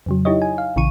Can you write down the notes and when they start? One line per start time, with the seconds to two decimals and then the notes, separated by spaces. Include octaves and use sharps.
0.06 F2 C#3 F#3
0.25 D#4 E4 G4 C#5 D#5
0.42 G#5
0.58 F5
0.76 A#1 C#3 E3 C#6 D#7